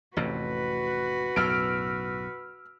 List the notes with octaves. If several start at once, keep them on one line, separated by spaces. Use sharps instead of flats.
A1 F2 C3 F#4 B4
B1 F#2 A2 E6 F6 D7